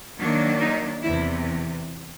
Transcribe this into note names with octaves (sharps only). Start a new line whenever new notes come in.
D#3 F#3 A#3 D4
D#4
E2 C3 E3 E4